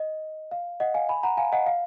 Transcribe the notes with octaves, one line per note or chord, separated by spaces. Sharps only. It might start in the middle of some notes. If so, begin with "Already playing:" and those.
Already playing: D#5
F5
D#5 F#5
F5 G#5
G#5 B5
F#5 A#5
F5 G#5
D#5 F#5
F5